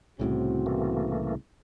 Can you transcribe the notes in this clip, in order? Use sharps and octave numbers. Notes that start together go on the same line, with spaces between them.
C2 A2 C#3 C4 F#4
E3 A3 A#3